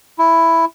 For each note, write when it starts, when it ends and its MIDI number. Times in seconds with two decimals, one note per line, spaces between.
0.18 0.65 64